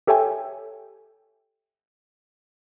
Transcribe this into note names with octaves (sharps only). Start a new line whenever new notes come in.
G4 A4 C#5 E5 G5 G#5